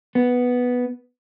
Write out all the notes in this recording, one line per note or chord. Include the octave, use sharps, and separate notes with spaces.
B3